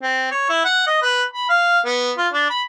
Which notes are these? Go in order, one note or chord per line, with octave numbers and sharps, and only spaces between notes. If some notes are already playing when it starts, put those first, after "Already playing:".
C4
C#5
E4
F#5
D#5
B4
B5
F5
B3
F4
D4
B5